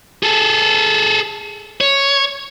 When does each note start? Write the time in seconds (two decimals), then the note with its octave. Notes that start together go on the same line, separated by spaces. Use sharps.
0.23 G#4 A4
1.81 C#5